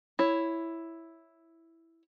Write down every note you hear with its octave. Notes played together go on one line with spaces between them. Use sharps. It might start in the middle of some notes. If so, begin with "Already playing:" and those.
E4 C#5